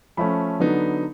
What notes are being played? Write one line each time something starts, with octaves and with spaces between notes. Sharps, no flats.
F3 A3 C#4 B5
D3 F#3 B3 D#4